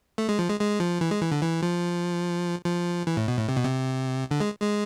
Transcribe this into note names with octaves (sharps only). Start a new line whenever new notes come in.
A3
G#3
F3
G#3
G#3
F3
E3
G#3
E3
D3
E3
F3
F3
E3
A2
B2
A2
C3
B2
C3
D3
G#3
G#3